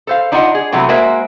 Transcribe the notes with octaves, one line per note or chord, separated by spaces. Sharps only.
A4 C5 F5
D4 D#4 F4 D#5 E5 F#5
G#4
C3 E3 F#3 A3 B3
G#3 A#3 F#4 A#4 C5 E5